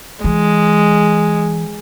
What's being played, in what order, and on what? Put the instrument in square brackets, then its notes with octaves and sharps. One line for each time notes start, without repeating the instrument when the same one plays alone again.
[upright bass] E3 [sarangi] G#3